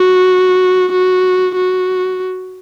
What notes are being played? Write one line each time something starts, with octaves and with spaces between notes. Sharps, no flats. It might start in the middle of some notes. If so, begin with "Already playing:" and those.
Already playing: F#4
F#4
F#4